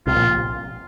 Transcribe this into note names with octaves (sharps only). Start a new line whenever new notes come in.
C2 C3 F4
A#1 A#2